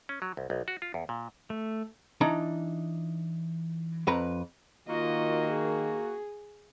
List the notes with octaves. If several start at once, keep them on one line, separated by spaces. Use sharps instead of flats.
C#4
F#3
C2
B1
F#4
F4
E2
A#2
A3
E3 D4 D#4 A#5
F2 B4 A#5
D#3 A#3 F4 F#4 D#5
G#4